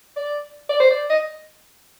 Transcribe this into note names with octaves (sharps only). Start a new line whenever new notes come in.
D5
D5
C5
D5
D#5